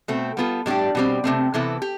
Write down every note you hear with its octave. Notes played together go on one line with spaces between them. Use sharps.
B2 A3 C4
G3 B3 F4 A4
A2 G3 D4 G4
B2 G3 C4
C3 F3 A3 C4
C3 E3 B3 E4 A4
G4